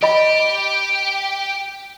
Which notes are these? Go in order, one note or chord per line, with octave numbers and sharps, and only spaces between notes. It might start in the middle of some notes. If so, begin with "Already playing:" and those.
G4 D#5 B5